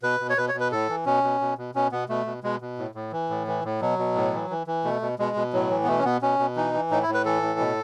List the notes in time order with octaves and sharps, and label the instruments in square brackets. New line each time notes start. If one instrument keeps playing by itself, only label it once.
[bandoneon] B2 B4
B2
C#5
B2 B4
C#5
B2
B4
A2 A4
E3
B2 C#4
B2
B2
B2
B2 C#4
B2 B3
B2 A3
B2
B2 G#3
B2
A2
A2
E3
A2
E3
A2
B2 F#3
B2
A2
E3
E3
E3
B2 A3
B2
B2 G#3
B2
A2 F#3
E3
B3
B2 A3
C#4
B2 B3
B2 C#4
B2
E3 D#4
E3
A2 D#4
E4
A2
B4
E3 A4
A2
B2